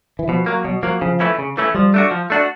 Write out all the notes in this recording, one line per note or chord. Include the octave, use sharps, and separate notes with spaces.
E3
B2 F3
F#3 A#3
B2 F#3
F3 F#3 A#3
C#3 F3
E3 A3 C#4 E4
C#3
E3 A3 C#4 E4
F3 G3
A3 D4 F#4
F3
A3 D4 F#4